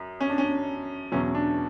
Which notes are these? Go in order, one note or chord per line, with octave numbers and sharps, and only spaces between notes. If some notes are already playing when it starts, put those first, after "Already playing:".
Already playing: F#2
C#4
D4
C#4
E2 B2 F#3 C#4
D4